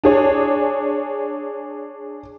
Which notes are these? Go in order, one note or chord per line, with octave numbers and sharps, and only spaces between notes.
D4 G#4 C#5